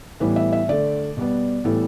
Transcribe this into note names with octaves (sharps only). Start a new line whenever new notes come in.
A2 E3 G3 B3 B4
E5
E5
D3 A3 D5
B2 G3 B3
A2 E3 G3 B3 A4